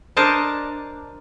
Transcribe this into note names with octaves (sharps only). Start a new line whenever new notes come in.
D4 A#4 C5 D#5 A5